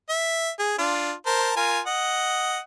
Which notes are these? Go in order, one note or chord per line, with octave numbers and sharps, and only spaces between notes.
E5
G#4
D4 F4
A#4 C5 A5
F4 A#4 G#5
D#5 F#5